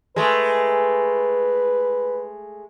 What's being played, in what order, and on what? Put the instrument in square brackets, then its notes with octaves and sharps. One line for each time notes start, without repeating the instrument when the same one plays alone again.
[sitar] G#3 A3 [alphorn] B4